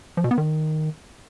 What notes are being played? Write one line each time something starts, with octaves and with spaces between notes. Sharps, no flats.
F3
B2
B3
D#3